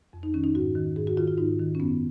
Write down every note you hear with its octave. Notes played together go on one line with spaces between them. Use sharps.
F2
D#4
D#3 C#4
D#4
G#2 F#4
D#3
G#2 G#4
F#4
D#3 F4
F4
G#2 D#4
D#3
C#4
F#2 B3